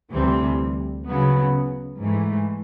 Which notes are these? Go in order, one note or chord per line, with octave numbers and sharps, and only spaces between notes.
D2 C3 E3 G3 C4
C#3 F#3 B3
G#2 E3 A3